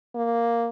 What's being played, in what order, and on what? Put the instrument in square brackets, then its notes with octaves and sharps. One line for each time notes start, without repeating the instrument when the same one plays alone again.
[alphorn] A#3